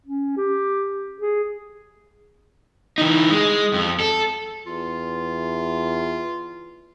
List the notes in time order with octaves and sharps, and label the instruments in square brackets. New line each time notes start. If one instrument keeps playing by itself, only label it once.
[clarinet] C#4
G4
G#4
[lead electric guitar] E3 D#4
G#3
F2
A4
[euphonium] E2 [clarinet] F4